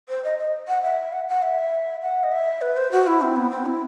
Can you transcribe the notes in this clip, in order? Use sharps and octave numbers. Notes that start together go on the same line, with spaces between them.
C5
D#5
D#5
F#5
E5
F#5
F#5
E5
F#5
D#5
E5
B4
C5
F#4
E4
C4
B3
C4
E4